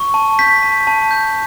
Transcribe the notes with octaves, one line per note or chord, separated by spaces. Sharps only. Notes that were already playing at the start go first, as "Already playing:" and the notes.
Already playing: C#6
A5
G6 B6
A5
A5
G6